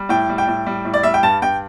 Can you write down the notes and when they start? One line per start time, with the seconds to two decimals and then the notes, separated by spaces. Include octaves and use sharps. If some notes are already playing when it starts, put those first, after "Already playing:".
Already playing: G3
0.09 A2 G5
0.29 G3
0.38 G5
0.48 A2
0.66 G3
0.85 A2
0.94 D5
1.03 G3 E5
1.14 G5
1.23 G2 A5
1.42 G2 G5